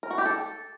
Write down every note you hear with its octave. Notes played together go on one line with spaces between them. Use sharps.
A#4
F#4
G4
A4